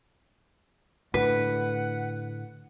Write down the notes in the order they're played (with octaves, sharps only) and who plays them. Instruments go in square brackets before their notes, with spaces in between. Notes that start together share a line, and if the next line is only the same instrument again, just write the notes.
[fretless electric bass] A2 D3 [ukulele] B4 [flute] F#5